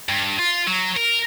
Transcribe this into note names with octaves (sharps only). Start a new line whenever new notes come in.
G2
F4
F#3
A#4